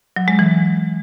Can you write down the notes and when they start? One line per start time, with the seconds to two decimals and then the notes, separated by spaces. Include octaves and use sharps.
0.16 F#3
0.28 G#3
0.39 E3